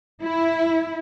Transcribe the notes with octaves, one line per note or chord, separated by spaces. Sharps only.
E4